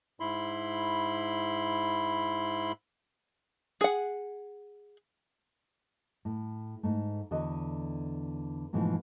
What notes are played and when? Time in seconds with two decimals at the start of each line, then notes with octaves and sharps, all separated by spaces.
0.20 G#2 E4 B5 C6
3.81 G#4 F#5
6.25 A2
6.83 G#2 A3
7.31 E2 D3 F#4 D#5
8.73 G#2 B2 E3 F3 A3